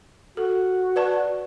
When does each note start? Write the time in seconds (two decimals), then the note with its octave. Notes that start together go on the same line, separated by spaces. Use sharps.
0.37 F#4 A4
0.96 B4 D5 A5